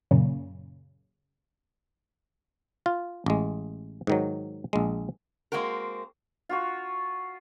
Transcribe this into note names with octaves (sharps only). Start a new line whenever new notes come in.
F#2 A#2 C#3
F4
A1 G#3
G#2 D#3 F#3
A#1 G#3
G#3 A#3 C4 F#4 A#4
F4 F#4 C#6